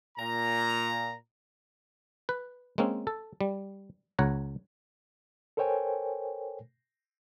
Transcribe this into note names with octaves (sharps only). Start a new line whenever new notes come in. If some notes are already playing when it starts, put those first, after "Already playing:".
A#2 A#5
B4
G#3 A#3 C4 C#4
A4
G3
C#2 C#5 F#5 A#5
A4 A#4 C5 C#5 G5 G#5